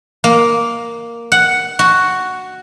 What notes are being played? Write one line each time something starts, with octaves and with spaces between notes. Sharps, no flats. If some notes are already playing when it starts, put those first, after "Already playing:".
A#3
F#5
F#4